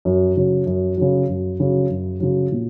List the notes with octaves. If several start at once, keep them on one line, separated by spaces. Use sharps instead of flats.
F#2
C#3 F#3
F#2
C#3 F#3
F#2
C#3 F#3
F#2
C#3 F#3
A#2